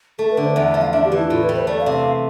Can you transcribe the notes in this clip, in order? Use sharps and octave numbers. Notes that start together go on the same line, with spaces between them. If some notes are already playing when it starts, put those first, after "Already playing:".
A3 A4
B4
D3
C5
E2 E5
E5
F3
F5
D4 E5
G4
E3
E4
A2 F4
B4
G3
C5
A3 D5
F5
C3
F5